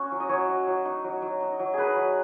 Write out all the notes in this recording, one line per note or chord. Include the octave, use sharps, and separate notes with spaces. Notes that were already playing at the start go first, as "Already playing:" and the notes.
Already playing: C#4 F#4
F#3
D#5
F#3 C#5
F#3
F#3
D#4
F#3
F#3
D#4
F#3
D#4 G#4 B4
F#3